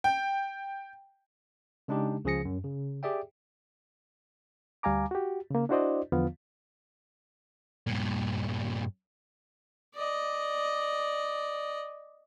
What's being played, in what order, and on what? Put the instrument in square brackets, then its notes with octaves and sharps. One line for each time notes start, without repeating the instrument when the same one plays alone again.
[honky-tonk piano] G5
[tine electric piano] C#3 G#3 D4 D#4 G4
C#2 C#3 F3 G#4 A#6 C#7
F#2
C#3
G4 G#4 D5 E5 G5
[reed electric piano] D2 G3 F5 G#5 A#5 D6
F#4 G4
C#3 A#3
D4 E4 F#4 C5 D5 D#5
E2 D3 F3 B3 F4 F5
[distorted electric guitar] G2 A#2
[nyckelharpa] D5 D#5